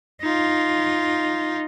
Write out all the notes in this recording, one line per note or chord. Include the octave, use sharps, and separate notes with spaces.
D#4 F4